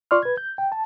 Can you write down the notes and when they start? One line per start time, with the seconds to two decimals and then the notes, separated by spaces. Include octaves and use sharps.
0.11 F4 D5 C6 C#6 F6
0.23 B4 G#6
0.37 G6
0.58 G5
0.72 A5